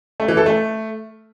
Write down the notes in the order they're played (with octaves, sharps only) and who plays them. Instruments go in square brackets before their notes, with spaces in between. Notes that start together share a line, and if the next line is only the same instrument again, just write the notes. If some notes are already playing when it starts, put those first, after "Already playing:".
[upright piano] A3
E3
A4
A3